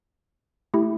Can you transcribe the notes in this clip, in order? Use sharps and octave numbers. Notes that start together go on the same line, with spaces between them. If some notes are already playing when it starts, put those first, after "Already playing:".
A3 E4 G4